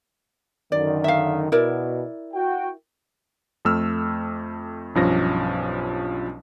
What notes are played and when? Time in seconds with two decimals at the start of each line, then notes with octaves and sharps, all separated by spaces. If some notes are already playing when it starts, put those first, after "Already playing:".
0.72 F#2 D3 D#3 D5
1.04 E5 F5
1.52 B2 E4 A#4 D5
2.34 F#4 G5
3.65 F2 A3 E6 F6
4.95 B1 G2 F3 C#4 A#6